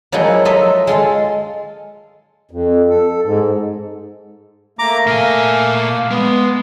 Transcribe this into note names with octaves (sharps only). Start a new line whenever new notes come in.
F3 F#3 G#3 A#3 D#4 E4
D#4 F4 A4 D#5 E5
G#3 F4 A4 F5
F2
A4
G#2
A3 A#3 A#5 D6
A#2 F5 G#5
G#3 B3